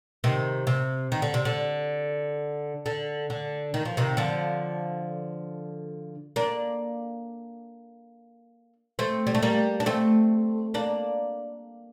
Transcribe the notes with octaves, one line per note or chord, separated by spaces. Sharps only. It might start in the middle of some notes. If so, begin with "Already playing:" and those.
C3 D#3
C3
D#3
D3
C3
D3
D3
D3
D#3
F3
C3 D#3
D3 F3
A#3 D4
A3 C4
G3
A3
G3 A#3
D4
A3 C4
A#3 D4